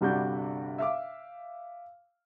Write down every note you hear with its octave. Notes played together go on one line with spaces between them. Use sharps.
G1 C3 G3 D4 F#4 G6
E5 F5 D6